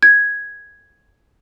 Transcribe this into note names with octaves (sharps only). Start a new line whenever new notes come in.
G#6